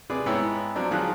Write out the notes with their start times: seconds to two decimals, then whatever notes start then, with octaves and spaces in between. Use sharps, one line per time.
0.10 C3 G#4 B4 D5 D6
0.26 G#2 B3 E4 C#5 G5 E6
0.76 F3 F#3 C4 D4
0.91 C#2 D#3 F3 F#3 G#4 F#6